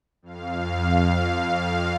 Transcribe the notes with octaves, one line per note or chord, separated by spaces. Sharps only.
F2 F5